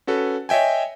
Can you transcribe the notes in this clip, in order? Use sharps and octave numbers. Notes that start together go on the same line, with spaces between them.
C#4 F#4 A4 B4
C#5 D#5 E5 G5 G#5